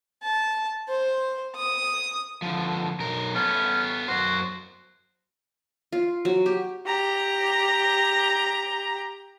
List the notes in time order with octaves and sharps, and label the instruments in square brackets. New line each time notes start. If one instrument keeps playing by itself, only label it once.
[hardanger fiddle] A5
C5
D#6
[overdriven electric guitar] D3 F3
B1 A#4
[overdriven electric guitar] B3 A4 [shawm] C#4
[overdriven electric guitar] F#2 C5 [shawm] F#4
[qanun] F4
F#3
G4
[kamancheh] G4 A#5